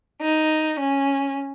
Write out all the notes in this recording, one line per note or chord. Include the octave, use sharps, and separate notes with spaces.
D#4
C#4